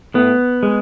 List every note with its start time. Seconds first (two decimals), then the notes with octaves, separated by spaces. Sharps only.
0.14 A2 B3
0.63 G#3